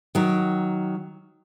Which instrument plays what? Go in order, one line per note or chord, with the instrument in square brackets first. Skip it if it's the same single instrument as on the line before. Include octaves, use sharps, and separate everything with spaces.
[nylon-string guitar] D#3 F#3